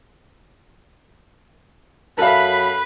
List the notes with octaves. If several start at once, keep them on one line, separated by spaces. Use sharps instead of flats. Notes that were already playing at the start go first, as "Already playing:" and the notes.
F#2 A4 B4 E5 F5 B5